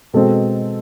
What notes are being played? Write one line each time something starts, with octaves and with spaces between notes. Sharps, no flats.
B2 G#3 C4 A4